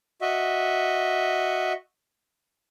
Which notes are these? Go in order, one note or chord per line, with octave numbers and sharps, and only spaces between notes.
F#4 D#5 E5